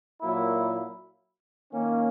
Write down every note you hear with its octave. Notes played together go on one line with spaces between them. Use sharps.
A#2 F#3 A#3 E4
D#3 A#3 C#4